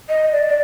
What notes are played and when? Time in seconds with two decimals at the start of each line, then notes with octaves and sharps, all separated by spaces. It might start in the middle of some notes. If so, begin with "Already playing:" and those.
0.09 D#5
0.32 D5
0.48 D5